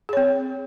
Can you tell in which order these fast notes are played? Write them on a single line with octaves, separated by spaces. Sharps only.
G#4 C#5 C4